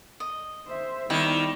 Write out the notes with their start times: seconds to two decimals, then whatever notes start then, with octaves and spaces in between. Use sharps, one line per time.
0.20 D#5
0.67 C5 E5
1.10 D#3 G3 B3 E4